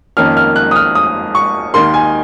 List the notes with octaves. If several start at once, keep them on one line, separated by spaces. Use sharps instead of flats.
F2 D#3 A#3 C#4 F6
F6
F#6
D#6
F6
D#6
C#6
D#2 D#3 A#3 D#4 C6
G#5